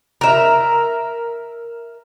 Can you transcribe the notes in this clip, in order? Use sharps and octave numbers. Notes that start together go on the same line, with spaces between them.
A#4 E5